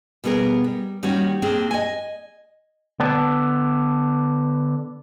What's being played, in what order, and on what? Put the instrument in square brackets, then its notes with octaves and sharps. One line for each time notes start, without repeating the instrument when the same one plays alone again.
[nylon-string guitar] B2 G3 B3 G#4 A#4
G3
D#3 G3 A#3 C#4 F#4
A#3 C4 D4 G#4
D#5 G#5
[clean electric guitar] D3 B3 D4